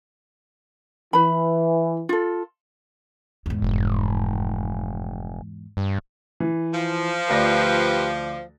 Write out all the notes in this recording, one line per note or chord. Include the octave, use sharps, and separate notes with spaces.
E3 B4 B5
F4 A4
E2 G#2
F1
G2
E3
F3
D2 G4 B4 D5 A#6